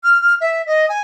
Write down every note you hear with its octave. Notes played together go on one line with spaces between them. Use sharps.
F6
F6
E5
D#5
G#5